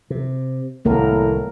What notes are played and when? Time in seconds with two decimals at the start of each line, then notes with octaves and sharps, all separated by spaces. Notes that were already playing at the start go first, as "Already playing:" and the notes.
0.10 C3
0.85 C2 A2 D#3 A#3 A#4